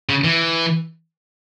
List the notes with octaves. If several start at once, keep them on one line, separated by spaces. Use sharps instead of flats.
C#3
E3